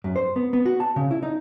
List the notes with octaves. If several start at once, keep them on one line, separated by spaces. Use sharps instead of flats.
F#2
C5
B3
B3
F#4
A5
C#3
E4
D#4